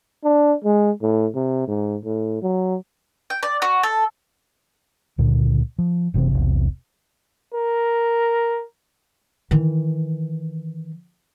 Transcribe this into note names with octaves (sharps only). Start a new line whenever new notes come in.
D4
G#3
A2
C3
G#2
A2
F#3
G5
D5
F#4
A4
C#2 A#2 D3
F3
F#1 C3 E3 C4
E1 B1 C3
A#4
D#3 E3